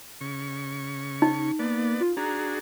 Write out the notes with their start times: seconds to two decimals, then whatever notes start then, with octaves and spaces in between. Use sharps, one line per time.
0.21 C#3 C#6
1.22 D#4
1.59 A#3 B3 D5
2.01 F4
2.17 D4 F#4 G#4 A#5